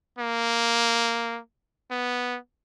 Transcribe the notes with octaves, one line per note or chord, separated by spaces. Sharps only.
A#3
B3